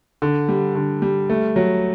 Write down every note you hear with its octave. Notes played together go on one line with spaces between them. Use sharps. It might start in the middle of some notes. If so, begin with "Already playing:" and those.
D3
G3
D3
G3
A3
F#3